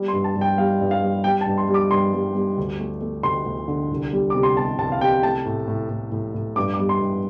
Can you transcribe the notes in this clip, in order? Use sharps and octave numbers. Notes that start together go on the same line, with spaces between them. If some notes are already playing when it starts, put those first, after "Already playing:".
Already playing: G3
C6
G2
A5
G2
G5
G3 F5
G2
F5
G3
G3 G5
A5
G2
C6
G3
D6
G2 C6
G3
G3
D2
A3
A3
D2 C6
D2
D3
C2
G3
C3 D6
C6
C3 A5
C2 A5
F5
C3 G5
A3 A5
A2
A2
A2
A2
A2
G2 D6
D6
G3
C6
G2